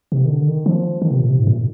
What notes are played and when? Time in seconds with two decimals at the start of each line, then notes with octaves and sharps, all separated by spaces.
0.12 C3
0.25 D#3
0.30 D3
0.48 D#3
0.66 F3
1.02 D#3
1.11 C3
1.20 A#2
1.29 C3
1.38 G#2
1.47 A#2